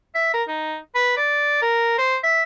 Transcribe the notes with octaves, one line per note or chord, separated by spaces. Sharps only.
E5
A#4
D#4
B4
D5
A#4
C5
E5